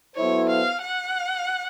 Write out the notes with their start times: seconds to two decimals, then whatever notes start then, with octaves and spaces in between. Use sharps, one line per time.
0.16 F#3 B3 E4 A4 C5 C#5
0.49 F5
0.83 F#5